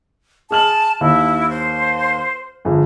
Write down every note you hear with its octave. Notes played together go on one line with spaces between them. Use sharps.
G#4 A5 F6 F#7
D#2 E4
C5
G1 F2 G#3